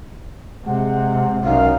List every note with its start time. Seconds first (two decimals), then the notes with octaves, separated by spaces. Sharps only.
0.66 C3 G#3 F#5
1.44 B1 F#2 D#4 F5